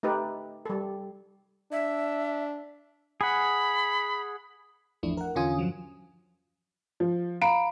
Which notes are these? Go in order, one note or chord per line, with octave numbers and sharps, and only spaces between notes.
A3 D#4 G4 B4
G3 A4
D4 E5
G#4 F#5 B5
G#1 E2 F3 A3 D4 E4
A#4 F#5
E2 D3 C#4 F4 G#5 D#6
G2 F3 F#3
F3
F5 A#5 B5 D7